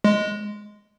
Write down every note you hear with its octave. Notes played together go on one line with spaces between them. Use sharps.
G#3